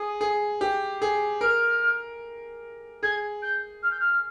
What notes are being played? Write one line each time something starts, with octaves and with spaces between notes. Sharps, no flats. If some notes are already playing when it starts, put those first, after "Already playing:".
Already playing: G#4 D#6
G#4
G4
G#4
A#4 F6
G#4 G#6
G6
F6
G6
F6